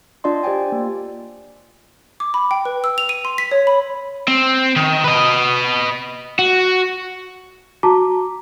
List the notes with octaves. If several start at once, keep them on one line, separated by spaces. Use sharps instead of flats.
D4 F4 D5 D#5 C6
G4 C5 D5 G5 G#5
A#3
D6
B5
G5
B4
E6
F7
D#7
C6
B6
C#5
B5
C4
D#3
B4 D#5
F#4
F#4 A5 A#5 D6